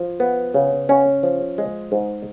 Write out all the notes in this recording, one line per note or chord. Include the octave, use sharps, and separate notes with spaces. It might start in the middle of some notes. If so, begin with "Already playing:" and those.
Already playing: F3
B3
C#3
C#4
F3
G#3
G#2